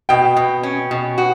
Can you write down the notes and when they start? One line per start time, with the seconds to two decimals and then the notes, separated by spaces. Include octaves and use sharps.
0.09 B2 G5
0.37 B2
0.63 C#4
0.91 B2
1.18 F#4